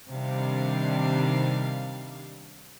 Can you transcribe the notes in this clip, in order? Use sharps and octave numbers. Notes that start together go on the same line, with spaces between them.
C3 D#3 G3 D4 F5